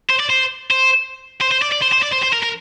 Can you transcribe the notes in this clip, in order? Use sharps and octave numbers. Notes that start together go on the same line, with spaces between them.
C5
D5
C5
C5
C5
C5
D5
D5
C5
C5
D5
C5
C5
A#4
A#4